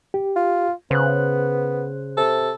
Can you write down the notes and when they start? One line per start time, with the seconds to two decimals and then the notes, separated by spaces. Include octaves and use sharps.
0.14 G4
0.36 F4
0.91 C#3 B3 C5 F#6
2.17 C3 A4